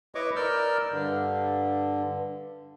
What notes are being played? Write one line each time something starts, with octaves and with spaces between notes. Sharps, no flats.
E4 B4 C#5 D#5 C#6 D6
A#4 D5 E6 F6 G6
G2 D3